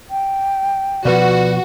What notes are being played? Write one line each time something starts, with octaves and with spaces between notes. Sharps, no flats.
G5
B2 F3 F#4 B4 D5